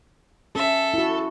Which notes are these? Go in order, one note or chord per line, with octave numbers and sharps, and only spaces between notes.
C#4 A4 E5
E4 F#4